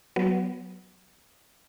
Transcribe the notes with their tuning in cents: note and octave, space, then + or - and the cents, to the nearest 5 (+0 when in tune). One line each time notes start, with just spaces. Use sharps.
F#3 +0 B3 +0